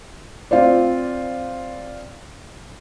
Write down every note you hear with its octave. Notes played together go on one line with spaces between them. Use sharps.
C4 F4 C5 D5